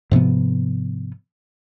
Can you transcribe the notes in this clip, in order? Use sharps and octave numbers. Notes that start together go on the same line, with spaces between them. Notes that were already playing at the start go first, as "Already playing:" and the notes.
G#2 C3 F3 B3